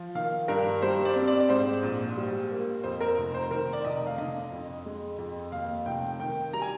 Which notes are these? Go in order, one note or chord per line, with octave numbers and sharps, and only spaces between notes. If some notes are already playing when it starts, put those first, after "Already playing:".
Already playing: F3
D#3 F5
G2 A#4
G3 C5
D5
C4
D5
D5
G#2 C5
A#1
G3
A#3
F2 C5
A#4
F1
C5
D#3 A#4
D5
F1 D#5
F5
D3 D#5
F2
G#3
F2
D#2 F5
F1 G5
D#3 G5
G3 A#5
G#5